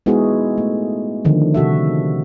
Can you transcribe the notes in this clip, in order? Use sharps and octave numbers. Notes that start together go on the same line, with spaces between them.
G#3 B3 D#4 E4 F#4 G#4
A3
D3 D#3 F3
C3 F#4 A4 E5